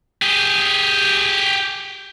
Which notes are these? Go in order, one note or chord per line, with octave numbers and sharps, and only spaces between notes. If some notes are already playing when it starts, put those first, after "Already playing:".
G4 G#4